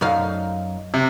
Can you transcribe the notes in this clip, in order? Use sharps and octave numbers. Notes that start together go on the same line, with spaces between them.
F#2 D#4 F5
C3